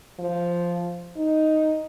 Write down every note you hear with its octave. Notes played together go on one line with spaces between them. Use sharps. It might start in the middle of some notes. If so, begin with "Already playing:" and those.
F3
D#4